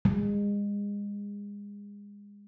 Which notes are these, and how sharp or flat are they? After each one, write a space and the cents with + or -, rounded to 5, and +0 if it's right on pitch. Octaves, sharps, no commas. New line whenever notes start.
G#3 -30